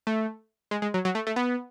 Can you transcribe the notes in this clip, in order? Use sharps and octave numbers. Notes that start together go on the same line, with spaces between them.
A3
G#3
G#3
F#3
F#3
A3
A3
B3